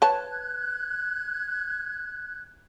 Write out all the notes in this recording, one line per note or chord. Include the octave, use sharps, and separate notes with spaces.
B4 C#5 A5 F#6 G#6